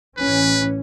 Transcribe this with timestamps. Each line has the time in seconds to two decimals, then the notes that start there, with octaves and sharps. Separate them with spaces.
0.18 A1 E3 C#4 B4